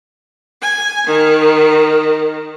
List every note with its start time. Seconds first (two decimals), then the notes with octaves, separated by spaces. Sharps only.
0.62 G#5
1.07 D#3